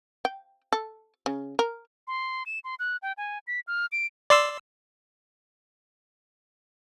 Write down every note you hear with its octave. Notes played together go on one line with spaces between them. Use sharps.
G5
A4
C#3
A#4
C6
E7
C6
F#6
G5
G#5
B6
F6
D7
D5 C6 E6